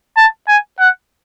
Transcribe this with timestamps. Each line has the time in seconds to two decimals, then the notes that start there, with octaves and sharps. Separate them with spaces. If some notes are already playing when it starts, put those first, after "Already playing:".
0.17 A5
0.48 G#5
0.80 F#5